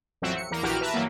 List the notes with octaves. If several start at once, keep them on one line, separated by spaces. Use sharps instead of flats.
A1 F2 F#3 C4 F#4 E5
C#7
E2 A#3 A#5
A#1 E3 F#4 G4 F6 D7
B4 E5 A5 A#5
G2 E3 F#3 A#3